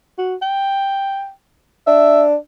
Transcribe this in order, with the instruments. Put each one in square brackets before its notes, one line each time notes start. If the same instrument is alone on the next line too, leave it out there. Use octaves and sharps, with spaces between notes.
[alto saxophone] F#4
G5
[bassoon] D4 [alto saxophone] E5